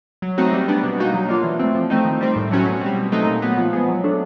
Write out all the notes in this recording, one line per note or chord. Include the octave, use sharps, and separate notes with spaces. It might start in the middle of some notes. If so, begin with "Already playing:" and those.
F#3
A3 C4 D#4 F#4
G3
B3 D4
B2
G3 A#3 D#4 F#4
F#3
A#3 D4 F4
E3
A3 C4
F3
A3 C4 D#4
D#3
G3 C4
A2
F#3 A3 C#4 F#4
B2
G3 C4
B2
F#3 A3 C4 D#4
A#2
F#3 B3
F3
G#3 B3
F#3
A3 D4